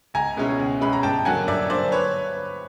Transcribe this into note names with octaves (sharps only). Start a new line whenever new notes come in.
C#2 G#5 A#5
B2 G#3 C#4 E4
C#2
B2 G#3 C#4 E4 B5
A#5
G2 G5 A5
D3 F#3 A#3 F#5 G#5
G2 D5 E5
D3 F#3 A#3 C5 D5
B4 C#5